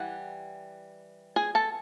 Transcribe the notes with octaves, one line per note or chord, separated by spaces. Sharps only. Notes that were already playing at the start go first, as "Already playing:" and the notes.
Already playing: E3 G3 F#5
G#4 G#5
A4 A5